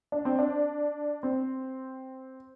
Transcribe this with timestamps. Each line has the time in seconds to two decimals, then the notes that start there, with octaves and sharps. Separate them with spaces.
0.12 D4
0.25 C4
0.39 D4
1.23 C4